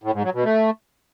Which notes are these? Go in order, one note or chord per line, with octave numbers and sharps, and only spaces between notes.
A2
G#2
F#3
B2
A3